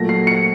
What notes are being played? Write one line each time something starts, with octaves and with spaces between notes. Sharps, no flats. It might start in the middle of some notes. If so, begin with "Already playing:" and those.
Already playing: A#2 F#3 A3 A#6
C7
C#7